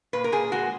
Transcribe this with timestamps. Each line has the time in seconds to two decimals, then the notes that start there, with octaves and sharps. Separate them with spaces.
0.13 A#2 B4
0.24 A#4
0.32 A#2 G#4
0.52 G#3 F#4